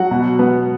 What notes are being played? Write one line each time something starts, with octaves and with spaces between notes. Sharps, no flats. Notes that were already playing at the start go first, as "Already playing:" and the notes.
Already playing: F#3 F#4 F#5
B2
B3